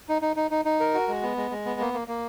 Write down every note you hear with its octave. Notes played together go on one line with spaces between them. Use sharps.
D#4
D#4
D#4
D#4
D#4
A#4
F#4
G#3
B3
G#3
G#3
B3
A#3
A#3
A#3